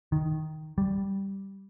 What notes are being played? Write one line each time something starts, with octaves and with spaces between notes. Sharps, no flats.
D#3
G3